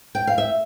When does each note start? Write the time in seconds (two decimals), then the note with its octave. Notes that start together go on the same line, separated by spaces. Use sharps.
0.15 G5
0.27 F5
0.38 E5